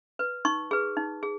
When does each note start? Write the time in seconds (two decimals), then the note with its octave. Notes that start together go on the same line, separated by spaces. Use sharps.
0.19 B4
0.45 D#4 C#6
0.71 G#4 B4
0.97 D#4
1.23 G#4